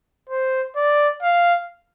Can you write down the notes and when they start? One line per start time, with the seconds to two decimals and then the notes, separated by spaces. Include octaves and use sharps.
0.29 C5
0.76 D5
1.23 F5